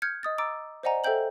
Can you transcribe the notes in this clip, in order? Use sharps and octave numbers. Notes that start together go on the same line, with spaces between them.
F6 G6 G#6 C#7
D#5 D#6 A6
A#5 D6 E6 A6 D7
C5 D5 D#5 F#5 G#5 A#5
A4 C5 E5 G5 G6 F#7